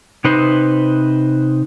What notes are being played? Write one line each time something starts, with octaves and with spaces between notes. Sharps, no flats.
C3 D#4 B4 C5